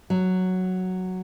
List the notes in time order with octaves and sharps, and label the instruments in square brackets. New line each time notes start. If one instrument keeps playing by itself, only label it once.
[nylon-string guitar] F#3